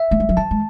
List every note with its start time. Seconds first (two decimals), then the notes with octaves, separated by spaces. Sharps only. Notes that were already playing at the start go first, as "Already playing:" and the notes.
Already playing: E5
0.11 A3
0.20 G#3
0.29 F#3
0.37 E3 A5
0.51 G#3